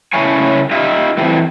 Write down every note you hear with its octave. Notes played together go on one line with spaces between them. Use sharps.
C#3 E4 A4 C#5 G#5
D#4 F4 G4 D#5 E5
E3 C4 E4 A4 C5